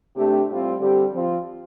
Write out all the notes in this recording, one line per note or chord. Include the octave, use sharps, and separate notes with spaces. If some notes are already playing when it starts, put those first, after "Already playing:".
C3 A3 D4 G4
A2 G3 C4 F4
D3 G3 C4 G4
F3 C4 F4